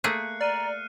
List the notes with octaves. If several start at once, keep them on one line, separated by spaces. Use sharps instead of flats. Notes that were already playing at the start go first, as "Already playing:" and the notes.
A3 A#3 G#4 F#6 C7 C#7
D5 A#5 F6 D#7